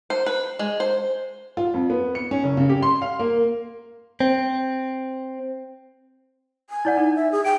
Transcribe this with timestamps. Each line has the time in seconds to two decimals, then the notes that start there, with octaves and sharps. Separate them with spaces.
0.10 C5
0.26 B4
0.59 G#3
0.80 C5
1.57 F4
1.74 F2
1.90 B3
2.15 C#7
2.31 C#4
2.43 F#1
2.57 C#3
2.69 G4
2.82 C6
3.02 F5
3.19 A#3
4.20 C4
6.70 G#5
6.85 E4 D5 F#5
6.98 D#4
7.16 E5
7.32 G#4
7.45 G5 D7